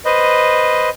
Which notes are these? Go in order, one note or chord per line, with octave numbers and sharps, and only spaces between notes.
B4 C5 D#5